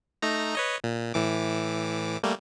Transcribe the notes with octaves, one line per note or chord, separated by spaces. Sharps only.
A3 D#4 A#5
B4 C#5 D#5
A#2
A2 E3 D6
G3 A3 A#3